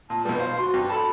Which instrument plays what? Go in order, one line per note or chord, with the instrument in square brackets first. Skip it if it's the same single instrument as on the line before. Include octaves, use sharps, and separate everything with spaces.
[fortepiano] A#2 [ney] A5
[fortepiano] B1 G3 [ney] B4
[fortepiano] C5 [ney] F5
[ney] F#4 [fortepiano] C6
[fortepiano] G2
[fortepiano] A4 A5 [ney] B5